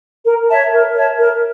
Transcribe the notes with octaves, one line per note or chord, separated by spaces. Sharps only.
A#4
C#5 E5 A5
A#4
C#5 E5 A5
A#4